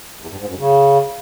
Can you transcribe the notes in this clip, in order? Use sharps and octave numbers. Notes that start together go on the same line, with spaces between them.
E2
G2
G#2
F#2
C#3